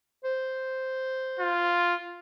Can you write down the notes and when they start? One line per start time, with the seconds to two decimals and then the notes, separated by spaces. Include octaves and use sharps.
0.24 C5
1.40 F4